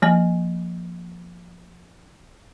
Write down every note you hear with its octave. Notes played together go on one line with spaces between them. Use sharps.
F3 A#3 G#5